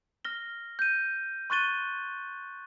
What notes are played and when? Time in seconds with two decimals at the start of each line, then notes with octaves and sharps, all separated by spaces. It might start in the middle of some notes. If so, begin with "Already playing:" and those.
0.25 F6 A#6 G7
0.79 G6 D#7
1.50 C6 C#6 F#6 A6 D#7 G7